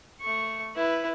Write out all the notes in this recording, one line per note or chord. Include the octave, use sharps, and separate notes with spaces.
A3 C#6
E4 B4